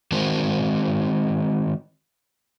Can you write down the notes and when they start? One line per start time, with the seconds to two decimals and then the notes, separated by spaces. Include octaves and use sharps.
0.12 D#3 G#3 C4 F#4 A#4 C5